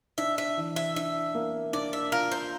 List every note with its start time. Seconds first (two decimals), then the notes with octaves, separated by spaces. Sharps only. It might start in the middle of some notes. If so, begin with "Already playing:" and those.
0.18 D4 E5
0.38 E5
0.57 E3
0.76 E5
0.96 D4 E5
1.35 A#3
1.73 D4 D5
1.93 E5
2.12 F4 A#4
2.32 C5